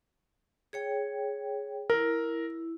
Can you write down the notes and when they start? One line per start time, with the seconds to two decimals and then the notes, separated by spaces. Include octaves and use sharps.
0.73 G#4 C#5 G5
1.90 E4 A#4